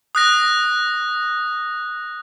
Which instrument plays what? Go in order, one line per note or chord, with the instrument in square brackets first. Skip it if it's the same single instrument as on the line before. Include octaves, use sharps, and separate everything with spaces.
[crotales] D#6 F#6 A#6